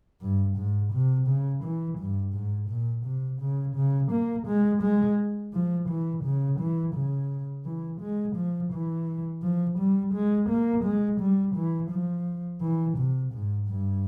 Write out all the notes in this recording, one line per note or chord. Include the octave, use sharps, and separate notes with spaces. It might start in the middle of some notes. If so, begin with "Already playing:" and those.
G2
G#2
C3
C#3
E3
G2
G#2
A#2
C3
C#3
C#3
A#3
G#3
G#3
F3
E3
C#3
E3
C#3
E3
G#3
F3
E3
F3
G3
G#3
A#3
G#3
G3
E3
F3
E3
C3
G#2
G2